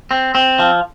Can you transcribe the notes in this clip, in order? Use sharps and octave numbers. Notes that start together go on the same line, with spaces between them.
C4
C4
F3